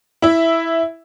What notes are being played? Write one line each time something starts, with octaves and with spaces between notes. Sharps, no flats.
E4 E5